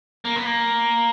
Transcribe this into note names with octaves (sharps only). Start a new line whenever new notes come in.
A#3
B3
A#3